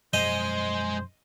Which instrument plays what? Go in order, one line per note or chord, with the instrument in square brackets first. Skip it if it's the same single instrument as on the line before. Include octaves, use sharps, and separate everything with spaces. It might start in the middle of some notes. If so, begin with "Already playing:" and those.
[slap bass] F#2 B2 F3 [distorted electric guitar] G#3 [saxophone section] C5 [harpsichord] D#5